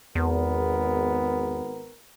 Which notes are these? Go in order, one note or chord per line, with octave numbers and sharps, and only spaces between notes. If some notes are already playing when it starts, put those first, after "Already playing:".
G#1 E2 B3 A#4